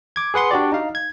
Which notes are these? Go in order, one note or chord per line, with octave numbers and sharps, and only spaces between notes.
D6 G#6
G#4 B4 F#5 C6
D4 F#4 G4 D5
D#4 F5
G#6